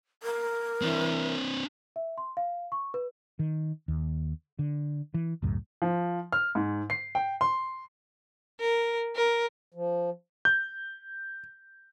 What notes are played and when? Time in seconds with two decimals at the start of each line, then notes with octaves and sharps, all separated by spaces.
0.23 A#4
0.82 E3 C4 D4
1.96 E5
2.18 C6
2.37 F5
2.72 C#6
2.94 B4
3.39 D#3
3.88 D#2
4.59 D3
5.14 E3
5.42 C#2 F#2 A2
5.82 F3
6.33 F6
6.55 G#2
6.90 C7
7.15 G5
7.41 C6
8.60 A#4
9.16 A#4
9.74 F3
10.45 G6